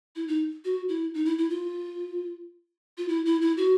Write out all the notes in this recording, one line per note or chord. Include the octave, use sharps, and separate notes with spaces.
E4
D#4
F#4
E4
D#4
E4
E4
F4
F4
E4
E4
E4
F#4